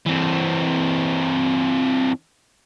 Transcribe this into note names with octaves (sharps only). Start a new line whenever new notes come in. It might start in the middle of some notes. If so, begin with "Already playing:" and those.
E3 C4